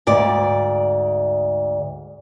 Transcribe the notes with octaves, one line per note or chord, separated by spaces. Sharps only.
D2 G#2 D5